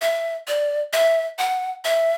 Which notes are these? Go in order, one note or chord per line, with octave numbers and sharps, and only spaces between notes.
E5
D5
E5
F#5
E5